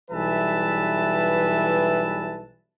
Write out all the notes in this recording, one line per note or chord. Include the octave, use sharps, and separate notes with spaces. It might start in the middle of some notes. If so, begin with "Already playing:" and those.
B1 E3 G3 B4 E5 A5